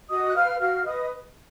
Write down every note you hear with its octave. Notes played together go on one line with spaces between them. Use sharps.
F#4 D#5 D#6
F#6
B4 F5 F6
F#4 F5 F6
B4 D#5 D#6